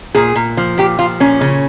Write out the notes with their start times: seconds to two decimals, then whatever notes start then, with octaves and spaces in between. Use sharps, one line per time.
0.15 A#2 G#4
0.36 A#2
0.57 F3
0.78 A#2 G4
0.99 F3 F4
1.20 A#2 C#4
1.41 C#3